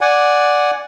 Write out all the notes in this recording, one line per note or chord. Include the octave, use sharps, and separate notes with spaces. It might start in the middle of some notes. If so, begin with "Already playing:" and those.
D5 F#5 G#5